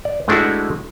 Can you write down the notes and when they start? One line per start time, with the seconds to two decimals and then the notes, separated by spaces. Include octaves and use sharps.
0.05 D5
0.28 G#3 A3 D4 E4 F#4